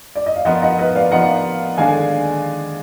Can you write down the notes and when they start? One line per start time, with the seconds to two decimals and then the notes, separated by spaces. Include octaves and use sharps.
0.15 D5
0.26 D#5
0.36 F5
0.45 F3 B3 F4 A#4 D#5 F#5
0.62 D#5 F#5
0.79 B4 D#5
0.96 D5 F5
1.11 F3 B3 F4 A#4 D#5 F#5
1.77 D#2 D3 G#3 D4 F5 G#5